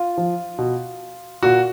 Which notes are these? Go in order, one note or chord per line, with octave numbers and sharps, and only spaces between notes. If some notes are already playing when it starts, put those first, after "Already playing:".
Already playing: F4
F3
B2
A#2 F#4